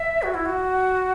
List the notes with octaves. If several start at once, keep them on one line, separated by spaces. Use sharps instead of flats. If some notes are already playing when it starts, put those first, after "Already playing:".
Already playing: E5
F#4
E4
F#4